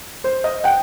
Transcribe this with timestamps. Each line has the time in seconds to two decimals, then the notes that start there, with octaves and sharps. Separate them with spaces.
0.24 C5
0.44 D#5
0.64 F#5 G5